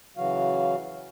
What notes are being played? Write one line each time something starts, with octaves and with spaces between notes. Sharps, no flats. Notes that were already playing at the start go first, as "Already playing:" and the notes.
C#3 E3 F#3 F#4 F5